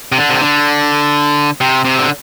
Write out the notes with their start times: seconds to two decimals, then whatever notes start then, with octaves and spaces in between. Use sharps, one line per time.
0.12 C3
0.17 D3
0.30 C3
0.41 D3
1.61 C3
1.85 C3
1.98 D3